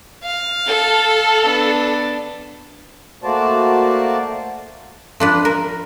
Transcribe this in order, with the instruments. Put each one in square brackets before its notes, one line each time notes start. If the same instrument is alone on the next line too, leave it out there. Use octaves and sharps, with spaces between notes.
[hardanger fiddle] F5
[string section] A4
[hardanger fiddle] B3 D4
[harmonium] A3 A#3 F#4 C5 D5 A5
[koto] F3 D4 B4
A#4